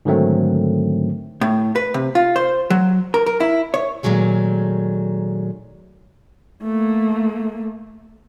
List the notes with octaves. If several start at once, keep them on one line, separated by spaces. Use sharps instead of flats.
G#2 D3 D#3 F#3 A3 C4
A2
B4
C3
F4
C5
F#3
A#4
A#4
E4
C#5
A#2 D#3 F#3 G#3 A3
A3 A#3